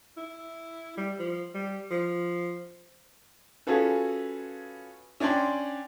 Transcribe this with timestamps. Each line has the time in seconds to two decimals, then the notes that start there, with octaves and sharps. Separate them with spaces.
0.17 E4
0.97 G3
1.19 F3
1.55 G3
1.91 F3
3.67 C#4 F4 F#4 G#4 A4 B4
5.20 C#4 D4 D5 G5 C6